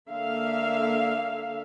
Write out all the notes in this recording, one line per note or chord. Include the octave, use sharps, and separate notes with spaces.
D3 A#3 E5 F5